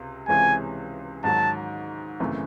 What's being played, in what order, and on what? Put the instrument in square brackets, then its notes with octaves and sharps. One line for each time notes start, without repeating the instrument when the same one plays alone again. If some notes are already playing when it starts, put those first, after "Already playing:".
Already playing: [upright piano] C#2 C3
[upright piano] C#2 C3 E3 G#3 C#4 [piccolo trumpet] G#5
[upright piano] G#2 D#3 F#3 [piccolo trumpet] A5
[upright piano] G#1 F#2 C#3 E3 A3